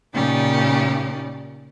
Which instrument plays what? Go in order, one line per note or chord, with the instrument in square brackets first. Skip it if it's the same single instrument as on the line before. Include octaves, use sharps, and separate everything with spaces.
[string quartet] A#2 C#3 C#4 D#4 G4 D5